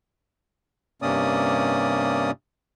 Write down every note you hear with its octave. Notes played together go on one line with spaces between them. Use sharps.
G2 C3 A#3 C#4 D5 D#6